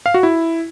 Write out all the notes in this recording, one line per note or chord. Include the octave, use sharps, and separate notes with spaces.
F5
F#4
E4